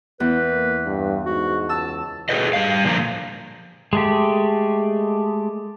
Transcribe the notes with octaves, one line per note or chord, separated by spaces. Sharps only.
E2 B4
A#3
G2
G#2 F#4
C#2 A5 E6
F#4 G#4 A4 B4 D#5
G3 F5
A#2 D3 F3 A#3 A#5
G#3 A3 G4